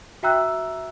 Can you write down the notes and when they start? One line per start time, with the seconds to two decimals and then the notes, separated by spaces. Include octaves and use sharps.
0.23 F#4 E5 G5 A#5 E6 F#6